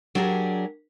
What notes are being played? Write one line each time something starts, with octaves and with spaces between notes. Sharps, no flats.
F#3 D4 G4 G#4 A#4